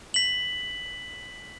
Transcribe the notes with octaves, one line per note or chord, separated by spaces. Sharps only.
B6 F#7